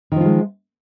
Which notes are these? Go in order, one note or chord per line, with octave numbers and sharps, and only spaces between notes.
D#3 F3 G#3 F4